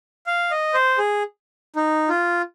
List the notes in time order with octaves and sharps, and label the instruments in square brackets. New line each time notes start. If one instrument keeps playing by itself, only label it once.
[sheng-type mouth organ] F5
D#5
C5
G#4
D#4
F4